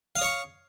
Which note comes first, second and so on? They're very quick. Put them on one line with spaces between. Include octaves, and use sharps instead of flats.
F5 D#6 C#5 C#6